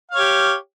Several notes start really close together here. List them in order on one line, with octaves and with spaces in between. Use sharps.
F5 C#5 G4